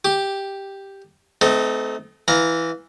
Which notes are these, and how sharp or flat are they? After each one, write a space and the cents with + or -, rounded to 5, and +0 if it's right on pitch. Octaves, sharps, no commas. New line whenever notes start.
G4 +0 D6 +10
A3 -25 C4 -40 D#4 +0
E3 +0 F5 +15 A#5 +0